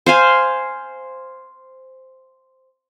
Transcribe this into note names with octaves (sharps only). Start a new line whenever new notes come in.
C5 F5 G#5